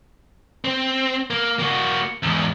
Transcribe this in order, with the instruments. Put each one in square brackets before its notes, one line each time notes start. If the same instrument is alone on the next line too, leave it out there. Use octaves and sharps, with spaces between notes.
[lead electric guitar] C4
A#3
A#3 F#4
E2 G#2